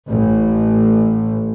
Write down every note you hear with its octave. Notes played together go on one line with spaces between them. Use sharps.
A1